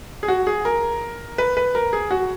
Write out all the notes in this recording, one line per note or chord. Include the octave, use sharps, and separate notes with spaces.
G#4
F#4
G#4
A#4
B4
B4
A#4
G#4
F#4